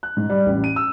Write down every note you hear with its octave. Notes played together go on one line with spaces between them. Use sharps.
F#6
G#2
G3
A1
D#7
E6